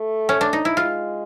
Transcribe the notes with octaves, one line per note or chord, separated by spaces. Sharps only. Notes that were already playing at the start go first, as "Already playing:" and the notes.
Already playing: A3
C#4
D4
D#4
E4
G#3 F4